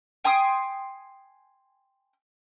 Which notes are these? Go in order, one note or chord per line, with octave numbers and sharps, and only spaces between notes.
G5 G#5 C6 D#6